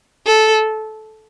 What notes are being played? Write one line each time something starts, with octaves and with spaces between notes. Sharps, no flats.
A4